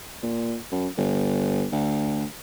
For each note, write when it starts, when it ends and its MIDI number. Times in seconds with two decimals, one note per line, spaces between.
0.23 0.56 46
0.72 0.88 42
0.97 1.66 31
1.72 2.25 38